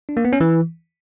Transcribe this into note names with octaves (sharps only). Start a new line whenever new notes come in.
D4
A#3
B3
C#4
E3